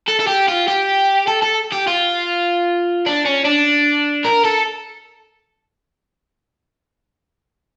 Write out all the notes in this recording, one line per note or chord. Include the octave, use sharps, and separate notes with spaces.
A4
A4
G4
F4
G4
A4
A4
G4
F4
D4
C#4
D4
A#4
A4